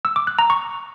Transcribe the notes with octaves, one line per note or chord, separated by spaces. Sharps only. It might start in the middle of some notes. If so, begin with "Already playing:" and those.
E6
D6
F#6
A#5
C#6